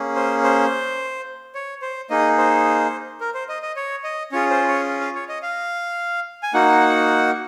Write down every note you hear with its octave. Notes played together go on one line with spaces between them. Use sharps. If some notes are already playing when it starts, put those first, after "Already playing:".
Already playing: A#3 C#4 G#4
C5
C5
C#5
C5
A#3 D#4 G#4 D#5
C5
A#4
C5
D#5
D#5
C#5
D#5
C#4 F4 G#4 C#5
C5
C#5
F5
C#5
D#5
F5
G#5
A#3 D#4 F#4 F#5